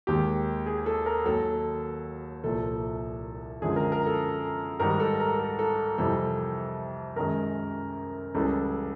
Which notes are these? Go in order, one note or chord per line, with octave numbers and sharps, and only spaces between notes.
D#2 D#3 G#3 G4
G#4
A4
A#4
D#2 D#3 F#3 A4
C2 A#2 F3 A4
F#2 D3 F3 G#3 G#4
A#4
A#4
A4
G#2 D#3 G3 A#4
A4
A#4
A4
A4
F2 C3 E3 G3 A4
F#2 D#3 G#3 A#4
C#2 C#3 E3 G3 A4